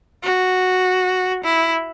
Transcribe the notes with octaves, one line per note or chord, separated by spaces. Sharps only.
F#4
E4